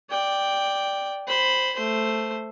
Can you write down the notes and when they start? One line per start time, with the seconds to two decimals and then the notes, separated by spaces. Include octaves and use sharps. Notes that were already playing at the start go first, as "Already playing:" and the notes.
0.10 D5 G5
1.27 C5 B5
1.75 A3 C5